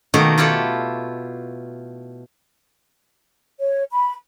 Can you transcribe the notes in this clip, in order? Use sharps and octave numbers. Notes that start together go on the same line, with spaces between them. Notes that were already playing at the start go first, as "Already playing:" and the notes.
B2 D#3 A3 A#3 D#4 F#4
E4 F4 G4 A4 F#5
C#5
B5